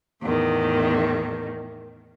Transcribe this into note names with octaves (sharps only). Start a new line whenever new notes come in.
E2 A2 D#3